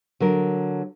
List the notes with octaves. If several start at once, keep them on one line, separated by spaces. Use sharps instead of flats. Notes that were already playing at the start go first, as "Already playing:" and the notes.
D3 F#3 A#4